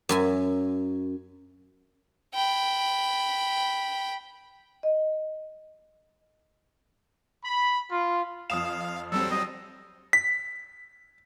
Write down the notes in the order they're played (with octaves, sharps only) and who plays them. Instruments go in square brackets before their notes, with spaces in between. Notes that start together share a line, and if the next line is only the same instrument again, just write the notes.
[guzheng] F#2 E5 G#5
[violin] G5 B5
[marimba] D#5
[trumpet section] B5
F4
[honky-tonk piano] F2 D#6 E7 [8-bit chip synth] F5
[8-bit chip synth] F#3 G3 C4 [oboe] A4
[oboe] D#5
[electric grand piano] B6